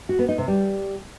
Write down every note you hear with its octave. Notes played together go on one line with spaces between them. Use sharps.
F#4
B3
D#4
C3
G3